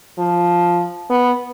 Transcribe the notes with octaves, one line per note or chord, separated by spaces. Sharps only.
F3
B3